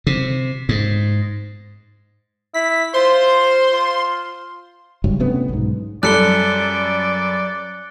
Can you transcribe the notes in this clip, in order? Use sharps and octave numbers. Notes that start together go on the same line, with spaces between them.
C3
G#2
E4 B6
F4 C5 C6
F4
F#1 C2 G2 F#3
D2 C3 B3 C#4
B1 G#2
F#2 G3 A4 D5 F#6 C#7 G7